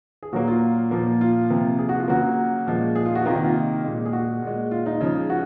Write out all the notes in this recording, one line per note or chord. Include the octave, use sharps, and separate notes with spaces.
G#4
A#2 F#3 A#3 F#4
F4
A#2 F3 A#3
F4
C3 F3 A#3
G#4
F#4
F4
C#3 F#3 A#3 F#4
A#2 F3 G#3
G#4
F4
F#4
C3 D#3 A#3 F4
D#4
F4
A#2 G#3
G#4
F#4
A#2 G#3
F4
D#4
C#3 F3 G#3
F#4